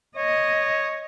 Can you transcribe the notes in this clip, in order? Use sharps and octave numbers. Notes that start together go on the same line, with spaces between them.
C#5 D#5